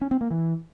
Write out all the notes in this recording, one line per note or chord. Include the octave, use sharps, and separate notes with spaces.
C#4
C4
A#3
E3